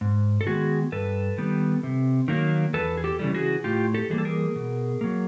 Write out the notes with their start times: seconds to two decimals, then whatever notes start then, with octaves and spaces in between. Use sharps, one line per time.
0.01 G#2
0.41 A4
0.47 D#3 G#3 B3 F#4 G#4
0.92 G2 A4 B4
1.38 D#3 G3 B3
1.83 C3
2.28 D#3 F#3 A#3
2.73 E2 A4 B4
2.97 G#4
3.04 G4 A4
3.19 C#3 E3 G3
3.34 F#4 G#4
3.64 A2 F4 G4
3.94 G4 A4
4.10 E3 G3 A#3 G#4
4.18 A4
4.25 G#4 A#4
4.56 B2
5.01 F#3 A#3